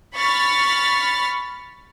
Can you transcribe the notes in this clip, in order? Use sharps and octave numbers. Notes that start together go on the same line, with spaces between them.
B5 C#6 F6 A6 B6